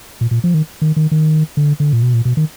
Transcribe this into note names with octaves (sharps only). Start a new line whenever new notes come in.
A#2
A#2
F3
D#3
D#3
D#3
D#3
D3
D3
A#2
B2
A#2
B2
D#3